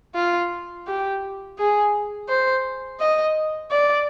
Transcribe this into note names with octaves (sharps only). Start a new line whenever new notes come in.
F4
G4
G#4
C5
D#5
D5